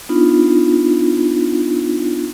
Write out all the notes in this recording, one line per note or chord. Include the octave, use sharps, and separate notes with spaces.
B3 D4 D#4 F4